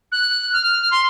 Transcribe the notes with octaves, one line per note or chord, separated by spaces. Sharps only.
F#6
F6
C6